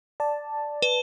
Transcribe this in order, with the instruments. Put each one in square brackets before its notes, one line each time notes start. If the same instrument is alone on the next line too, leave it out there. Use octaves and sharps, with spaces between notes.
[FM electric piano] D5 A5
[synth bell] B4